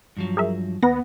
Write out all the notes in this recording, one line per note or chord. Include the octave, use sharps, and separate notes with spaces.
G2 F3 F#3
G#4 A#4 E5
D#2 B3 B4 F#5 A#6